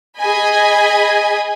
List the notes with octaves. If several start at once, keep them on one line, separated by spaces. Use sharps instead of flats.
G#4 D#5 G#5 B5